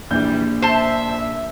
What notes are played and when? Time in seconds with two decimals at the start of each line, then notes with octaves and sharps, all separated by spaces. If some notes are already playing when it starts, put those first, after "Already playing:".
0.10 A#1 A#2 E3 G3 G6
0.62 C5 E5 A5